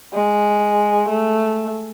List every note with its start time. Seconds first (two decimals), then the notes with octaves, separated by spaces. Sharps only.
0.14 G#3
1.09 A3